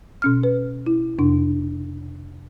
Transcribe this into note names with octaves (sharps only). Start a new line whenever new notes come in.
B2 C#4 F6
B4
E4
F2 C3 D4